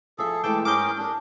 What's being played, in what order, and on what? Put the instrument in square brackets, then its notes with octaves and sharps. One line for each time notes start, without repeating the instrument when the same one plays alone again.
[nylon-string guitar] F3 E5 [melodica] G#4 A4
[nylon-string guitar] E3 G#3 A3 [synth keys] G5 [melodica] A5 D6
[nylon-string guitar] G#2 [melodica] C#4 G#4 A#4 [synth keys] D6 G6
[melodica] D4 [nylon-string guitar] G4 A#4